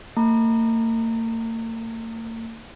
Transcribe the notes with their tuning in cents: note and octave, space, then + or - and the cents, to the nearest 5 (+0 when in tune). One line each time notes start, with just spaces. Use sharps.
A#3 -45 A#5 -30